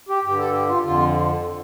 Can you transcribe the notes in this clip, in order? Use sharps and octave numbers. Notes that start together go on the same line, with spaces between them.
G4
G2 D3 G4
A4
G4
F4
F2 D3 F4